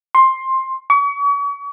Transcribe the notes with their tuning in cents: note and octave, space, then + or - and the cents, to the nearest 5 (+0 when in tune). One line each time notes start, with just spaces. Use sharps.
C6 +15
C#6 +40